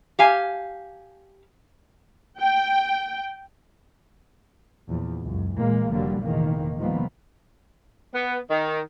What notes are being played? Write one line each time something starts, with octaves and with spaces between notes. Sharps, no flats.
G4 F5 G#5
G5
E2 A#2 F3
C#2 F#2
A#2 E3 G#3 A#3
F1 D3 F#3 G3 A#3
F1 E2 A#2 D#3 A#3
C3 D#3 F3 G3 A#3 B3
B3
D#3